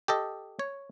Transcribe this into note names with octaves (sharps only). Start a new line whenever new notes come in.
G4 A4 D#5
C#5